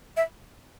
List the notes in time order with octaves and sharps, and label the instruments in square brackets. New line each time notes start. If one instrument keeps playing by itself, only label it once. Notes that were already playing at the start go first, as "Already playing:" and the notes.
[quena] E5